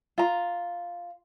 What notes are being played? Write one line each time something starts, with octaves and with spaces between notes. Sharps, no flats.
F4 A#5